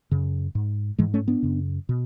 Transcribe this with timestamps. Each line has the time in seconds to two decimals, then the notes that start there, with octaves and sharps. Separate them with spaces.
0.11 F#2 C#3
0.55 G#2
0.99 G#2 E3 G#3
1.14 A3 C#4
1.28 B3 D4
1.42 F#2 C#3
1.89 B2